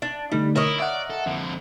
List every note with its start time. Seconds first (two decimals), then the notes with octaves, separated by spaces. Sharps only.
0.02 D4
0.32 D3 G3 A3 D#4
0.56 E4 A#4 C#5 D#5
0.80 D5 E5 F#5
1.10 A4
1.26 F2 D3